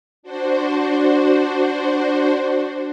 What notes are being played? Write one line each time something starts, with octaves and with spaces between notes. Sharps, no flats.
D4 F#4 C5